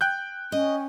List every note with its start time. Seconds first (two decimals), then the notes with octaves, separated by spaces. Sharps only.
0.01 G5 F#6 G6
0.52 C#4 D#5